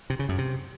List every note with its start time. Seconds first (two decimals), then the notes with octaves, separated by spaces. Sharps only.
0.10 C3
0.19 C#3
0.29 F#2
0.38 C3